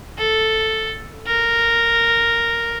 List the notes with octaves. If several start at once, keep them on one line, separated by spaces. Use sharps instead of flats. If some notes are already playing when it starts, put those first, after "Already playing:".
A4
A#4